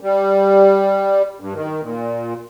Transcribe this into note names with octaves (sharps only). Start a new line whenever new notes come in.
G3
G2
D#3
A#2